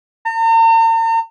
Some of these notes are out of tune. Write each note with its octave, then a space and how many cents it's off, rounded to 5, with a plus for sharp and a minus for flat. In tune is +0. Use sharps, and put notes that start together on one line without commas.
A#5 -45